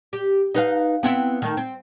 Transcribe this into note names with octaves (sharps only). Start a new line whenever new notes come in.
G4
D#4 B4 F5
B3 C4 E4
D#3 A3
C4